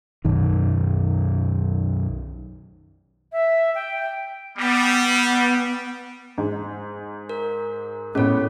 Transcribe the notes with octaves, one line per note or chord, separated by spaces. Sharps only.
B1 F#2 D#3
E5
G5
G3 B3
G#2
A#4
A2 G#3 B3 C#4 C#5